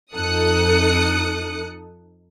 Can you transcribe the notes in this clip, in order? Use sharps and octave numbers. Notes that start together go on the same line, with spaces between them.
F2 D#4 A4 D#6 F#6 C#7